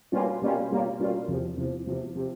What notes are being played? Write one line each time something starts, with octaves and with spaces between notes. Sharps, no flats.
B2 G3 A#3 C#4 F4
B2 G3 A#3 C#4 F4
B2 G3 A#3 C#4 F4
B2 G3 A#3 C#4 F4
E2 C3 F3
E2 C3 F3
E2 C3 F3
C3 F3